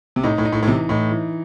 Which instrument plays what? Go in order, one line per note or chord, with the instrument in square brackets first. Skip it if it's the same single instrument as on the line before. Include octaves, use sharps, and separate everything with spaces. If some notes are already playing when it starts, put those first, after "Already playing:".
[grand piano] C3
[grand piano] A2 [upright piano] D#4
[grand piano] A2
[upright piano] D#4
[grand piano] A2
A2
[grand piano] C3 [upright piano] E3
[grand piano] A2 [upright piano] D#4
[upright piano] E3